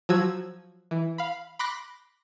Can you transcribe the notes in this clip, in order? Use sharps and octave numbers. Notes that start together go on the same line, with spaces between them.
F3 F#3 F#4 D#6 E6 G#6
E3
F5 B5
B5 C6 D6 F#6 A#6 B6